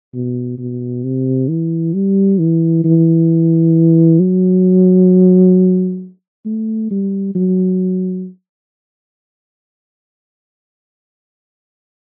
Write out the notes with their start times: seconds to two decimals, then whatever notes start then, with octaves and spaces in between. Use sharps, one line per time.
0.14 B2
0.58 B2
1.03 C3
1.49 E3
1.94 G3
2.40 E3
2.84 E3
4.20 F#3
6.46 A3
6.91 G3
7.35 F#3